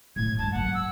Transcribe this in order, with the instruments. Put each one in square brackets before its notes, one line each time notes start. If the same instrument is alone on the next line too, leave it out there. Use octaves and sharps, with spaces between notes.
[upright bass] A1 A2 [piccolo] G#6
[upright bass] G2 G3 [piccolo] A5
[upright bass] F#3 A#3 [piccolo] F#5
[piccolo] E6